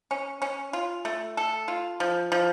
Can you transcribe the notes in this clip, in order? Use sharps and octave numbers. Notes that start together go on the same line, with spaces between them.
C#4
C#4
F4
A3
A4
F4
F3
F3